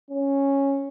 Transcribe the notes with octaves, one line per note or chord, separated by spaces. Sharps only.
C#4